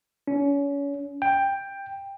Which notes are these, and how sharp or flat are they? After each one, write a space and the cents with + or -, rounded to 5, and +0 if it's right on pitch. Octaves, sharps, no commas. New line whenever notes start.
C#4 +30
G5 +10